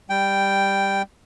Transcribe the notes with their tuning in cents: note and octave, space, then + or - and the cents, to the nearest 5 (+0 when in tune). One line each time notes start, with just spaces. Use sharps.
G3 +10 G5 +0